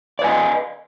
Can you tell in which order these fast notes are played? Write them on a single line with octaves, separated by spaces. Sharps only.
D5 B4 G#5 D#5